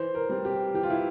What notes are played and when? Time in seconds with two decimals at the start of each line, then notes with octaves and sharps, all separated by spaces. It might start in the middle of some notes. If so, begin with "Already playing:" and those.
Already playing: E3 C5
0.15 A#4
0.29 G3 C4
0.45 G4
0.74 E3 G4
0.83 F4
0.90 E4